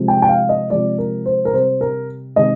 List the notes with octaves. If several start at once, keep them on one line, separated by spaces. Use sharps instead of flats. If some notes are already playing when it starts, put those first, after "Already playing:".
Already playing: C3 F3 G#3
G5
G5
F5
D#5
C3 F3 G#3 D5
A#4
C5
A#4
C3 G3 C5
A#4
C3 D#3 G#3 D#5